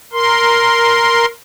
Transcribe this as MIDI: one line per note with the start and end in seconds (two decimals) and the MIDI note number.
0.13 1.26 70
0.13 1.26 84